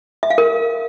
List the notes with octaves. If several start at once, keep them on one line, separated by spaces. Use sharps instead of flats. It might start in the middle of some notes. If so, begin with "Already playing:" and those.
E5
F5
A#4